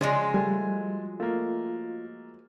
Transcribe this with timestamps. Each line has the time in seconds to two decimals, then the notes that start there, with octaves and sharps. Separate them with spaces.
0.01 C#3 F3 F#3 G#3 C#4 D5
0.34 G3 A3 G#5
1.20 A3 A#3 F4